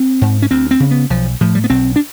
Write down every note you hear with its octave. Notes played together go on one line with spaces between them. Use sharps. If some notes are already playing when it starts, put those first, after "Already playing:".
Already playing: C4
G#2
C#4
D2 C4
C4
C#3
B3
B1 F3
A2 F3
G3
B3
B1 C4
D4